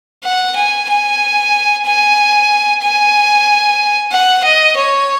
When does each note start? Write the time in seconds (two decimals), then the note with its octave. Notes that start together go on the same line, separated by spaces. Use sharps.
0.23 F#5
0.55 G#5
0.89 G#5
1.85 G#5
2.82 G#5
4.11 F#5
4.44 D#5
4.77 C#5